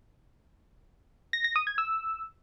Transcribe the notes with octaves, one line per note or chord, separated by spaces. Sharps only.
A#6
A#6
D#6
G#6
E6